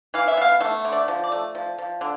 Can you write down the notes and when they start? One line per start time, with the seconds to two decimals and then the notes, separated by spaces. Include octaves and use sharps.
0.14 E3 F5
0.28 E5
0.37 B3 F5
0.60 A3 E5
0.85 D3
0.92 D5
1.08 F3
1.24 D5
1.32 A3
1.55 F3
1.78 F3
2.01 D3